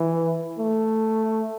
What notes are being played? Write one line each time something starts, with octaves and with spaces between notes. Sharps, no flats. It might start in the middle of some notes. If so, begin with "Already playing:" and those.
Already playing: E3
A3